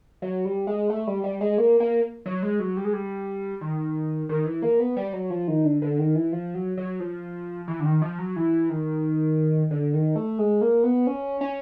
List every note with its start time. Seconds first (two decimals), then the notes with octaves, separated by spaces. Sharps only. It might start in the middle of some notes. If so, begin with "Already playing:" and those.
0.22 F#3
0.45 G3
0.67 G#3
0.90 A3
1.07 G3
1.24 G3
1.41 G#3
1.58 A#3
1.80 A#3
2.26 F#3
2.43 G#3
2.60 F#3
2.77 G3
2.85 G#3
2.93 G3
3.61 D#3
4.29 D#3
4.46 E3
4.62 A#3
4.80 B3
4.97 G3
5.13 F#3
5.30 F3
5.48 D#3
5.65 D3
5.82 D3
5.99 D#3
6.15 E3
6.32 F3
6.55 F#3
6.77 F#3
7.00 F3
7.68 E3
7.80 D3
7.85 D#3
8.02 F3
8.19 F#3
8.36 E3
8.70 D#3
9.71 D3
9.94 D#3
10.16 A3
10.39 G#3
10.61 A#3
10.84 B3
11.07 C#4
11.41 C#4